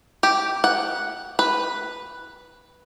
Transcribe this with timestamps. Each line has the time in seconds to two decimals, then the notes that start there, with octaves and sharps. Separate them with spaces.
0.23 G4
0.64 F#5
1.39 B4